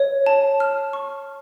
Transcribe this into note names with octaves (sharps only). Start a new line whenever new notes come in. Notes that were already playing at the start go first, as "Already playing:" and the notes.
Already playing: C#5
A5
F6
C#6